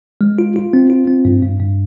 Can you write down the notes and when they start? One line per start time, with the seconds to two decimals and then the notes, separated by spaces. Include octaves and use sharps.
0.21 G#3
0.39 F4
0.56 F4
0.73 C4
0.90 F4
1.07 C4
1.25 G2
1.42 G2
1.60 G2